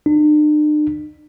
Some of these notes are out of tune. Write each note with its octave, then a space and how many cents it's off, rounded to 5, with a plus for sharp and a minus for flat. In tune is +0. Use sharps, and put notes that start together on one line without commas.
D4 +45